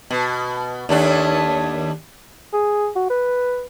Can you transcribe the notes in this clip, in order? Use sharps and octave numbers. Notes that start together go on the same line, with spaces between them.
B2
D#2 A3 D4
G#4
F#4
B4